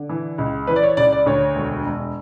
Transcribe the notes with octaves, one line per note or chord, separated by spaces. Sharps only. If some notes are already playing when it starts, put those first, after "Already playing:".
Already playing: D3
E3
C#2
E3 B4
D5
C#5
C#2 D5
D5
D2 C#5
E1
E1